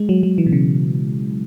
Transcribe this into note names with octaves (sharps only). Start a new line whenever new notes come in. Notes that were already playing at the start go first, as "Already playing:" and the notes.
Already playing: G#3
F#3
F#3
E3
B2
C#3